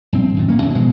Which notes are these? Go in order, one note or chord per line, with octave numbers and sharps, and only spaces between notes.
A#1 G2 C4
G#1 F#2 A#2
A1 A#3 C#4
D#1 F#2 A2 F#3
B2 E3 F3 G#3